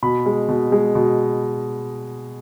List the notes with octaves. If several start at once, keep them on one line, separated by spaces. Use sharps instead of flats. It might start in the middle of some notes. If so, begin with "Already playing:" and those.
B2 B5
G#3
B2
G#3
B2